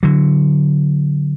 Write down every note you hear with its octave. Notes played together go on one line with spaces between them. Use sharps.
D3 F#3